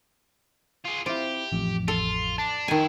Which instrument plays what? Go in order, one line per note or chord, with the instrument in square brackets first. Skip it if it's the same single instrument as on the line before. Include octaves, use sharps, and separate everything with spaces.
[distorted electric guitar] F4 G#4
[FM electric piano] C4 E4 [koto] F4 [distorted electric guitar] G4
[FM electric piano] A1 F2
[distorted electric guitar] F4 [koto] A4
[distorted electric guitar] D4 [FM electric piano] A5
[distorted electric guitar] F2 E4 [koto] D#3 G#5